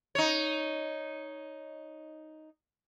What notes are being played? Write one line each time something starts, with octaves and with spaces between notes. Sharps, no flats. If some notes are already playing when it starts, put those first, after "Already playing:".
D#4 C#5